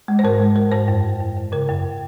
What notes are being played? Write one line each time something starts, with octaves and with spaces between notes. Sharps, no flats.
G#3
C5
G#2 A#4
G#3
G#3 A#4
G#2 C5
F#2
F#2
F#2
F#2
C#3 A#4
F#2